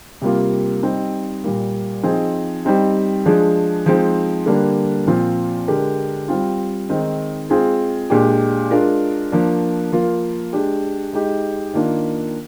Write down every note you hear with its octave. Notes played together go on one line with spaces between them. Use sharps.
C3 G3 A#3 F4
G3 C4 D#4
A#2 G3 A#3
F3 C4 D#4 G#4
G3 C4 D#4
F3 G#3 D4 G#4
F3 G#3 C4 D#4
D3 G3 A#3 D4
A#2 F3 C4 F4
D3 G#3 D4 G4 A#4
G3 C4 F4
D#3 G#3 C4 D#4
G#3 C4 F4 G#4
A#2 G#3 D4 G4
G#3 D4 F4 A#4
F3 A#3 D4
F3 A#3 F4 A#4
G#3 D4 G4
G#3 D#4 G4
D#3 A#3 D4 F4